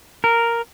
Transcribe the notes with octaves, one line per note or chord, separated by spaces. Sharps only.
A#4